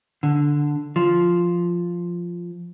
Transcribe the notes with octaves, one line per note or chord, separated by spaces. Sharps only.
D3
F3